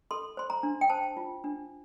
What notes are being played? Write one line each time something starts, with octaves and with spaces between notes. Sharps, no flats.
A4 C6
C5 C6
A#5
D4
G5
C5 A5
F4
D4